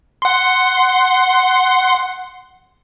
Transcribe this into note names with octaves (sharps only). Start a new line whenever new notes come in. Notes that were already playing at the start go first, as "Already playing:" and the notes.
F#5 C6